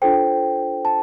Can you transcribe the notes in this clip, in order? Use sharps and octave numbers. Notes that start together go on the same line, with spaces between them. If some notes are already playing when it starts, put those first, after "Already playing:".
D4 F4 A4 C5 G5
A5